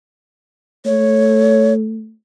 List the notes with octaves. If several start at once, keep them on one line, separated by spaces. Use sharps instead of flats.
A3 C#5